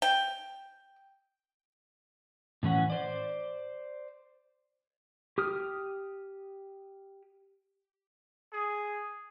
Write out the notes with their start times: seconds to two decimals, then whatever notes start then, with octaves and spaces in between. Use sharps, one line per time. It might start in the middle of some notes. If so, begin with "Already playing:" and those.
0.02 G5
2.63 A2 E3 C#4 F#5
2.90 C5 D5
5.38 G4 D#6 F6
8.53 G#4